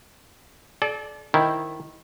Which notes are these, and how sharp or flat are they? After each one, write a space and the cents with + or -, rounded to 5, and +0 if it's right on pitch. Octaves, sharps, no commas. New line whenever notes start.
A4 -40 D5 +0
D#3 +0 E4 +0 C5 +10